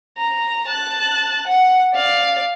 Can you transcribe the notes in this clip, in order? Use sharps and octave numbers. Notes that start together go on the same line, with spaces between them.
A#5
A5 F#6
F#5
D5 F5